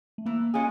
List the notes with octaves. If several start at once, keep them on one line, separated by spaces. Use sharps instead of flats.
A3
E3 A#3
G#3 C#4 F4 G#4